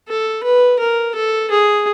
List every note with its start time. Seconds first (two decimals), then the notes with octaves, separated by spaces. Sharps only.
0.09 A4
0.44 B4
0.79 A#4
1.15 A4
1.50 G#4